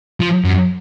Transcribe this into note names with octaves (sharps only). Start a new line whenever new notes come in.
F3
F#2